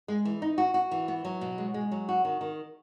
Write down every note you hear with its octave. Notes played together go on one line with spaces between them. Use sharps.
G#3
E3
D#4
F#4
F#4
E3
B3
F#3
B2
G#3
G#3
F#3
F#4
D#3
D#3